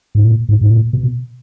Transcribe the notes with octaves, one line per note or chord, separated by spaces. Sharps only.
G#2
A#2
G#2
G#2
A#2
B2